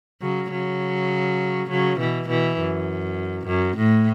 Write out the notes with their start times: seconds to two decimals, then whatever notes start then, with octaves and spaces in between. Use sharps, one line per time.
0.22 C#3 F#3
0.51 C#3 F#3
1.70 C#3 F#3
1.99 B2 E3
2.28 B2 E3
2.59 F#2
3.47 F#2
3.77 A2